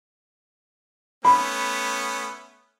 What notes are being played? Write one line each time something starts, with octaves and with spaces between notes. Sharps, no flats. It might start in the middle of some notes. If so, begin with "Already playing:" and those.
A3 B3 C#4 B5